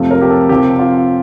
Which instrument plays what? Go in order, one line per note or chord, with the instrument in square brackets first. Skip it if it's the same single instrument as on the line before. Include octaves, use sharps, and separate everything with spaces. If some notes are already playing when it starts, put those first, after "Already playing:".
Already playing: [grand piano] F2 C3 F3 A3
A#4
G4
A4
C3 F3 C4 G4
F4